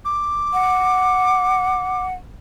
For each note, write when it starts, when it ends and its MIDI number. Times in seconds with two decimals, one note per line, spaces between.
0.05 2.07 86
0.53 2.14 78